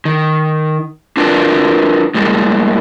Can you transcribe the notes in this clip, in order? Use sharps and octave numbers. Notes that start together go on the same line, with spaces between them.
D#3
D4 F4 F#4 A#4 B4 D5
A2 G3 G#3 A#3